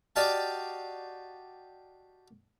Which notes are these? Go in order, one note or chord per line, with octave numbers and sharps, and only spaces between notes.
F#4 G4 D5 D#5 F5 A5